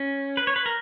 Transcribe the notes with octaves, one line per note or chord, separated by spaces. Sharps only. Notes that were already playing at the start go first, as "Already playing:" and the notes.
Already playing: C#4
B4
C#5
B4
A#4